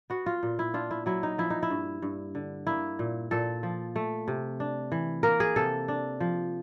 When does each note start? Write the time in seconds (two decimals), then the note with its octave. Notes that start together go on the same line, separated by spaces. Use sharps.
0.10 B3 F#4
0.26 F4
0.43 A#2
0.59 E4
0.74 D4 F4
0.91 E4
1.06 F#3 E4
1.23 D#4
1.38 F3 E4
1.50 D#4
1.63 E4
1.70 G2
2.02 G2
2.35 D3
2.67 A#3 E4
2.99 A#2
3.31 A#2 A4
3.63 F3
3.96 A3
4.28 C3
4.60 D4
4.92 E3
5.23 A#3 A#4
5.40 G#4
5.56 C3 A4
5.88 D4
6.20 F3